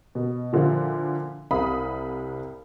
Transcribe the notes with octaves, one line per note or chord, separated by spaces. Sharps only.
B2
A#2 D3 F3 E4 F4
C2 C3 F5 B5 D#6